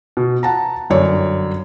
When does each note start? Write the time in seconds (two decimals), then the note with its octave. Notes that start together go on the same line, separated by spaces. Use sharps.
0.17 B2
0.43 F#5 A5 A#5
0.90 G1 F#2 C#5 D5